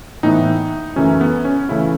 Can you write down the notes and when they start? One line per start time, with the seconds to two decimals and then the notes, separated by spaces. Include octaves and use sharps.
0.23 A2 E3 B3 D#4
0.96 F#2 E3 A3 C#4
1.21 B3
1.45 C#4
1.69 C#3 E3 A3 E4